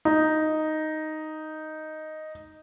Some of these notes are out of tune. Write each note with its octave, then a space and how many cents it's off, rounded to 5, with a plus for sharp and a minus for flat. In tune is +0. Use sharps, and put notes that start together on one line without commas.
D#4 +0